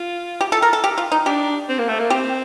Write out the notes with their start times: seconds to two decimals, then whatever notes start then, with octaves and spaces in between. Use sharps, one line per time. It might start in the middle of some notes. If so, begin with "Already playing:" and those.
Already playing: F4
0.41 G4
0.52 A4
0.62 A#4
0.73 A4
0.84 G4
0.98 F4
1.12 D#4
1.26 D4 G4
1.69 C4
1.78 A#3
1.88 A3
1.99 A#3
2.10 C4 G4